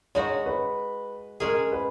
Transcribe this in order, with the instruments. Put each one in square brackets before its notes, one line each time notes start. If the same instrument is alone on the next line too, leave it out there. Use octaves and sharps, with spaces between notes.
[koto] G#3 D#4 F#4 [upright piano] C#5
[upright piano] B4
[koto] G#3 C#4 G#4 [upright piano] A#4
[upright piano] B4